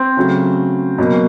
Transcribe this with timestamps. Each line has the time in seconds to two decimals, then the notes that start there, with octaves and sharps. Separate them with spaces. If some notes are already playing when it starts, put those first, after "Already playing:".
Already playing: C4
0.17 C#3 F#3 A3
0.98 B2 F#3 A#3